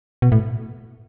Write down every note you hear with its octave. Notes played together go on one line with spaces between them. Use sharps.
B2
A2